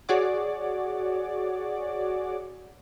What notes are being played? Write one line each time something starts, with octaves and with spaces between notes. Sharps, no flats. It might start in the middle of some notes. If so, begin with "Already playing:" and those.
F#4 G#4 C#5 D5 F#5 D6